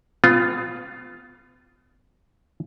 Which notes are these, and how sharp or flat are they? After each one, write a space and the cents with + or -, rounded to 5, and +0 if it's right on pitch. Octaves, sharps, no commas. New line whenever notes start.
B3 +35 F4 +0